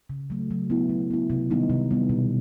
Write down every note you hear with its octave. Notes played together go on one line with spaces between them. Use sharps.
C#3
F#3 A3
F#3
B3 E4
F#3
B3 E4
C3
D#3 G3 B3 D#4
C3
D#3 G3 B3 D#4
B2